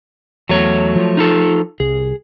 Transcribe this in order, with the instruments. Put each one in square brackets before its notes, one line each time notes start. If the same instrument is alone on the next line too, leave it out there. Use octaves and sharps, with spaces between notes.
[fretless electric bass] E2 [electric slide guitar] F#3 A3 C#5
[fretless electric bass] F3
[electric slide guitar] D#4 F4 A4
[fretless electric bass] C2 [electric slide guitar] G#4